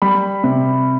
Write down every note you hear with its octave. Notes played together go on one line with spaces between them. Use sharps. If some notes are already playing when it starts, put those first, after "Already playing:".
G3 B5
C3